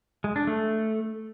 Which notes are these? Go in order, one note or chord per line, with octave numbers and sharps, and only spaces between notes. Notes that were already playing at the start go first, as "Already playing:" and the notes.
G#3
D4
A3